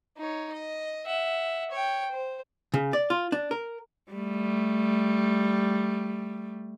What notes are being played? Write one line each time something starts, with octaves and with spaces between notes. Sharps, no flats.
D#4 C#5
D#5
E5 F#5
C#5 G5
C5
C#3
D5
F4
D4
A#4
G3 A3